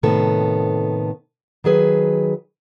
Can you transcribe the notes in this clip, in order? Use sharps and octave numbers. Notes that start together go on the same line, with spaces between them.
A2 C3 D#3 B3 A4
D#3 F#3 G#4 B4